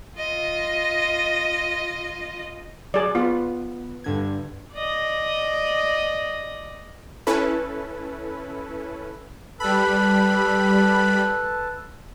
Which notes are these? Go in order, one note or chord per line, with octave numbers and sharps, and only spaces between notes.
F4 D#5
F#3 G#4 D5
B3 F4
G2 D3 G#6
D5 D#5
C#4 E4 A4 B4
G3 A4 B4 A5 B5